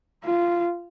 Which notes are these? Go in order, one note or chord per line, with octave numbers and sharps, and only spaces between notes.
F4